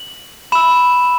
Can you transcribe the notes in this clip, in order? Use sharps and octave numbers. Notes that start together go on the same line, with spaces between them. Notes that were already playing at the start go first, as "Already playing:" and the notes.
Already playing: F#7
B5 E6 E7